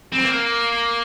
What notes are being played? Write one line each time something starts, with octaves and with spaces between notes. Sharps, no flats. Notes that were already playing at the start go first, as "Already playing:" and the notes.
C4
A#3